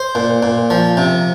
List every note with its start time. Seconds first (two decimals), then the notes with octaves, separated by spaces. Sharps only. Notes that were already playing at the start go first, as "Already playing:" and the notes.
Already playing: C5
0.15 A#2
0.43 A#2
0.70 F3
0.97 C3